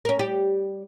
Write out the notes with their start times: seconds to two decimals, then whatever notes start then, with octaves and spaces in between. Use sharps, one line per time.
0.05 C#4 A#4
0.19 G3 G4